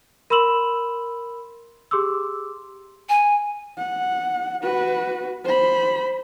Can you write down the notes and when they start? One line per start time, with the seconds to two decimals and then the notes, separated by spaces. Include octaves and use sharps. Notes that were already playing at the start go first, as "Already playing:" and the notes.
0.30 A#4 B5 C6 E6 E7 F#7
1.91 G4 G#4 C6 D6 E6
3.09 G#5
3.77 F#5
4.63 F#4 B4
5.44 C5 B5